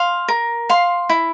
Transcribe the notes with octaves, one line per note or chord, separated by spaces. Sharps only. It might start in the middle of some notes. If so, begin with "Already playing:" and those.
Already playing: F5 C6
A#4
F5 C6
E4